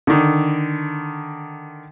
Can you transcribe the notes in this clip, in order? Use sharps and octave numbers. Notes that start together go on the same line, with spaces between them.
D3 D#3